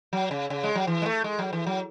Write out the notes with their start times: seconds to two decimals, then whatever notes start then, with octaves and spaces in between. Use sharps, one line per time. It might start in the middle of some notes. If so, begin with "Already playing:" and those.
0.13 F#3
0.31 C#3
0.50 C#3
0.64 G#3
0.75 F#3
0.87 E3
1.02 G#3
1.06 A3
1.24 G#3
1.39 F#3
1.53 E3
1.67 F#3